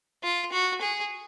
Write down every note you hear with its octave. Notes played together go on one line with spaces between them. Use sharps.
F4
F#4
G#4